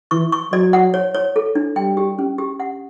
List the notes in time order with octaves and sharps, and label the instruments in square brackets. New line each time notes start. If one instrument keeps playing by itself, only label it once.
[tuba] E3 [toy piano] C#6
[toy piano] C#6
[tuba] F#3 [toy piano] D5
[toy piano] F#5
C#5
C#5
A4
D4
[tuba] G3 [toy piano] G5
[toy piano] G4
C#4
G4
F#5